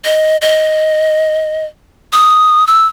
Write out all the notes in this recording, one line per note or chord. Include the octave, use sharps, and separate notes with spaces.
D#5
D#5
D#6
E6